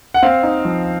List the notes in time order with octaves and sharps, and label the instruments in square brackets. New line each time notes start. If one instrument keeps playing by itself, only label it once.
[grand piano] F#5
C4 F5
D#4
F3